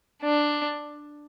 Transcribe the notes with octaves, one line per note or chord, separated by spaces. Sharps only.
D4